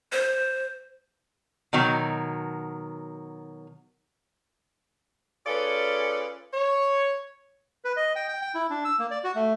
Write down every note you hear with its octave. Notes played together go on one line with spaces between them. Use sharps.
C5
B2 D#3 F#3
C#4 F4 G#4 A4 B4 D5
C#5
B4
D#5
G5
G5
G5
E4
D4
E6
A#3
D5
F#4
A3